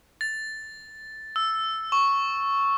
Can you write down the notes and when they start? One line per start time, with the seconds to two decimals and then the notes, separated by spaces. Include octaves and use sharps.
0.21 A6
1.36 E6
1.92 C#6